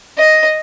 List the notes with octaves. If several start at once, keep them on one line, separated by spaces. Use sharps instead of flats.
D#5